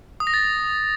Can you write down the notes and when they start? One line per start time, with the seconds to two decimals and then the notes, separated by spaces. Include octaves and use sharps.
0.20 D#6
0.27 A#6
0.34 A6